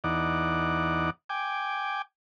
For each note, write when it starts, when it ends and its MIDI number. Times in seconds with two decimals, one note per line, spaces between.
0.04 1.10 40
0.04 1.10 63
0.04 1.10 74
0.04 1.10 78
1.29 2.02 79
1.29 2.02 80
1.29 2.02 86